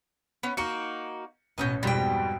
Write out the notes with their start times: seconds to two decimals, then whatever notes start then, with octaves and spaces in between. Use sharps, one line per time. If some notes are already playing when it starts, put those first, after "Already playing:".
0.43 B3 C#4
0.57 A#3 D#4 F#4 C#7
1.58 A1 B2 F#3 C#4 D#5 G6
1.83 F2 G#2 B2 G3 G5